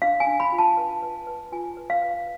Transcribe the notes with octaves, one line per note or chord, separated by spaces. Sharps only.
D4 F5
G#5
D4
B5
F4
A5
B4
B4
B4
F4 G#5
B4
F5
B4